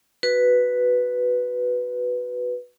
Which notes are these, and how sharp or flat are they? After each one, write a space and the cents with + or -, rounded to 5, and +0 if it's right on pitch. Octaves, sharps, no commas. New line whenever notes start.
F#4 +0 B4 +0